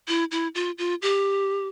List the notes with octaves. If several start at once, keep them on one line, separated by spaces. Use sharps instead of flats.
E4
E4
F4
F4
G4